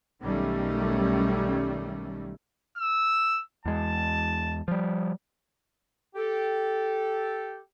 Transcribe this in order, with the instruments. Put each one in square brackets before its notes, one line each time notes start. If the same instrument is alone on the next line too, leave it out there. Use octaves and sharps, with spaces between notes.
[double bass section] B1 D#3 G3 A3 C#4
[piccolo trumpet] E6
[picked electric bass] E2 G#3 [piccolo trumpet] A5
[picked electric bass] F3 G3
[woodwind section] G4 A4